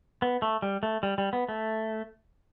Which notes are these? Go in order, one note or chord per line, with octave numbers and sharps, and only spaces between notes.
B3
A3
G3
A3
G3
G3
B3
A3